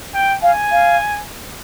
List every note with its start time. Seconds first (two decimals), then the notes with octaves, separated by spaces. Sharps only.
0.14 G5
0.42 F5 G#5
0.71 F5